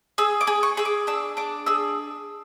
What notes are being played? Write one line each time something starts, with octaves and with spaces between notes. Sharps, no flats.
G#4 E6
D6
G#4
C#6
G#4 E6
D6
D4 E6
D4 D6
G#4 E6